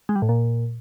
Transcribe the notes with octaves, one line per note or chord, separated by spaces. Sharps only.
G#3
G3
A2
A#2